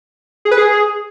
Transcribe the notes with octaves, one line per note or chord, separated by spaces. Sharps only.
G#4
B4
G#4